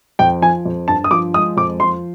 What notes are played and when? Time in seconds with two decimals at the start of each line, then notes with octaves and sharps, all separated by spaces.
0.19 F2 G5
0.42 F3 G#5
0.65 F2
0.88 G2 A5
1.04 D#6
1.11 F3 D6
1.34 G#3 D#6
1.57 F2 D6
1.80 F3 C6